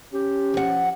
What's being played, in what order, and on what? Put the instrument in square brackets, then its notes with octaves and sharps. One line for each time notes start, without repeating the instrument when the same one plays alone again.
[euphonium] C#4 [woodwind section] G4
[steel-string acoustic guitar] F3 F#5